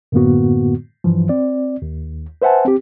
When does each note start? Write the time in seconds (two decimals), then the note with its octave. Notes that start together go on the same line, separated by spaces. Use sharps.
0.12 F#2 A2 D3 A#3 B3 F#4
1.04 G2 E3 F3
1.29 C4 D5
1.82 D#2
2.42 B4 C5 E5 F#5 G#5 A5
2.65 C4 G4